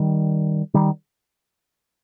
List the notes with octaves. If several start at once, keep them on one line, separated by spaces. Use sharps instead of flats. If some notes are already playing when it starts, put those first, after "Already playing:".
Already playing: D#3 G3
D#3 G3